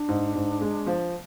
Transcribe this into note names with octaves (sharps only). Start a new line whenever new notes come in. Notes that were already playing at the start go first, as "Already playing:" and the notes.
Already playing: D4
G#2
G#2
G#3
F3